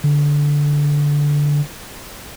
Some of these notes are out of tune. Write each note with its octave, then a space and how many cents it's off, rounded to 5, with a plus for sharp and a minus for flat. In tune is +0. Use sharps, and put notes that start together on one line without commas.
D3 -10